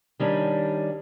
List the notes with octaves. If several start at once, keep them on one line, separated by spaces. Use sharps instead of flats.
D#3 G3 C#4 D4